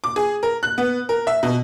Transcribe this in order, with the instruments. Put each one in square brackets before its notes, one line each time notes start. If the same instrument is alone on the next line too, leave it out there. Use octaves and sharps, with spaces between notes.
[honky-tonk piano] D6
G#4
A#4
F#6
B3
A#4
E5
B2